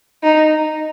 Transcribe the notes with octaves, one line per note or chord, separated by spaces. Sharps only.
D#4